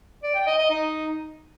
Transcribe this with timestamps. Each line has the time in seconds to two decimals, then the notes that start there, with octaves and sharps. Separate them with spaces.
0.23 D5
0.35 G5
0.47 D#5
0.58 D#5
0.70 D#4